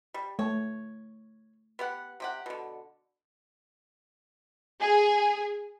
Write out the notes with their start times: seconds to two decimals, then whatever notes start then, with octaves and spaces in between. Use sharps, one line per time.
0.14 G3
0.39 A3 C#5
1.79 B3 G4 F#5
2.20 C3 G4 F#5
2.46 B2 D3
4.80 G#4